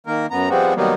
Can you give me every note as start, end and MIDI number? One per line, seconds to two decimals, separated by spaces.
0.07 0.26 51
0.07 0.26 58
0.07 0.26 70
0.31 0.49 42
0.31 0.49 59
0.31 0.49 82
0.50 0.74 53
0.50 0.74 55
0.50 0.74 56
0.50 0.74 59
0.50 0.74 60
0.50 0.74 66
0.76 0.94 51
0.76 0.94 54
0.76 0.94 55
0.76 0.94 58
0.76 0.94 59